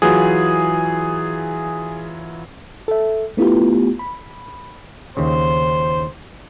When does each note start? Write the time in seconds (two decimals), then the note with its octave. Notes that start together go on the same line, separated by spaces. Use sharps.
0.02 E3 F#3 F4 G#4
2.88 A4 E5
3.37 A3 B3 E4 F4 G4
3.99 B5
5.17 D#2 C#3 C5